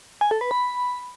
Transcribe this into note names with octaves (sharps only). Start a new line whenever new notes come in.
G#5
A4
B4
B5